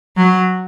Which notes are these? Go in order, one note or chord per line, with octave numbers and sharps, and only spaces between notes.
F#3